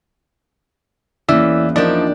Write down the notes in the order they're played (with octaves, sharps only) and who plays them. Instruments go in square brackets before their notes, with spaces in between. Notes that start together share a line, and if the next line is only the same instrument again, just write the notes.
[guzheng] E2 [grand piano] E3 [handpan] A#3 C#4 [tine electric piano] D5 E5 E6
[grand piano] F3 [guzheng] D4 G4 [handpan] D#4 A#4 [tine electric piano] F4 D5 D#5